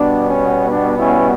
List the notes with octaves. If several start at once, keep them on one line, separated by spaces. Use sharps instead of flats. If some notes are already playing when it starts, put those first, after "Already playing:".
Already playing: B2 G3 B3 D4
C#4
D4
C#4 E4